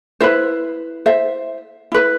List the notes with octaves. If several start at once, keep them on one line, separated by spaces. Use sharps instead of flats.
E4 B4 C5 E5
C5 E5
E4 B4